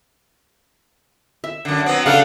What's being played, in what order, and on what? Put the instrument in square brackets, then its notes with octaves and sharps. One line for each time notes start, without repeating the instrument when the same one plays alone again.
[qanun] E5
[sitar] F#2 D3
F#3 B3 C4
[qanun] C#3 A4 [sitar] G3 A3 D4 [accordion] F5 F#5